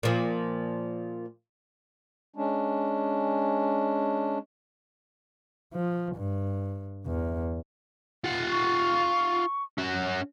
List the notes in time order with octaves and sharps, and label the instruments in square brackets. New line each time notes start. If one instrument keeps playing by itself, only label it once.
[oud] A#2 F3
[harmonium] G#3 C#4 D4
[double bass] F3
G2
E2
[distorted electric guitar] F4 F#5
[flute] C#6
[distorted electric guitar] C#4 F#4